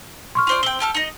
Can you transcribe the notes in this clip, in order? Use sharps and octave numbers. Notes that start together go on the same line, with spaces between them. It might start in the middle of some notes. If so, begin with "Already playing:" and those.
C6 C#6 F6
F4 C5 D5
C4 G5 G7
G4 A4 F6
D#4 D#5